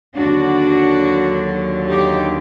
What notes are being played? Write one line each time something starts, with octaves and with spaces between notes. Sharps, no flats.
D#2 D3 F#3 D4 F#4
D#4 G4